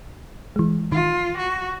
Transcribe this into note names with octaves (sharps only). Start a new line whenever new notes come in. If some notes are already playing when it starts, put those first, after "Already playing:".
E3 G#3
D#3 F4
F#4